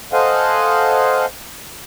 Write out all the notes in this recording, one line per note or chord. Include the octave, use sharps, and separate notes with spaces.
A4 C5 D#5 F5 F#5 G#5